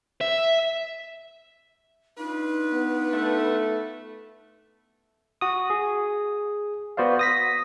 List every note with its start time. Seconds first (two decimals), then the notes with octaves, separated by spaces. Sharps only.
0.21 E5
2.18 D4 D#4 F4 B4
2.73 B3
3.13 A3 A4
5.41 F#4 D#6
5.70 G#4
6.97 B3 F#4 C5 D5 F5
7.19 D#6 A#6 B6